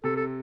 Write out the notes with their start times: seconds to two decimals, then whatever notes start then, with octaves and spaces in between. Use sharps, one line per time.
0.04 C3 A4
0.16 A4